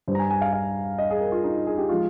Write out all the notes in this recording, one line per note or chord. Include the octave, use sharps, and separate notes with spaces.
G2 G3 C5
A#5
G#5
G#5
F5
F5
D#5
G#4
A#4
F4
D#4
G#4
G4
F3 G#3 F4